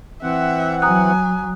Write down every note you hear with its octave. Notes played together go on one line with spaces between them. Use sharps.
E3 C4 E5 F#5
F#3 G#5 A#5 D#6 F#6